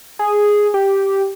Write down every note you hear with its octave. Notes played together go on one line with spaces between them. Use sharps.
G#4
G4